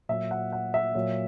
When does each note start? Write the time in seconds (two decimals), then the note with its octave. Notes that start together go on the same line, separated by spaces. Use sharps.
0.09 A#2 F#3 E5
0.31 F#5
0.52 F#5
0.74 E5
0.95 A#2 F#3